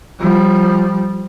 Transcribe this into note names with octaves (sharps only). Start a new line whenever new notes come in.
F3 G3